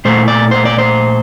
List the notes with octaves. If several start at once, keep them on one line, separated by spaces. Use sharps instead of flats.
A#2 A3 C5
D5
C5
D5
C5